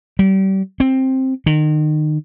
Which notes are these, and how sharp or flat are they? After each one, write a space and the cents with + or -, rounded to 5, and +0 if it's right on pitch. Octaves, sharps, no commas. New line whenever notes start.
G3 -35
C4 +10
D#3 -30